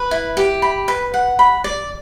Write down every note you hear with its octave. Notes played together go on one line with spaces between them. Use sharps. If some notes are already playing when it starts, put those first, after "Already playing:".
Already playing: B4
E4
G4
B5
B4
F#5
B5
D5